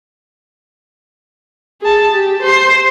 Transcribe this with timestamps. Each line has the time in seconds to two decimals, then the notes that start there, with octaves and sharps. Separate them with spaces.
1.81 G#4 A5
2.12 G4
2.43 C5 C6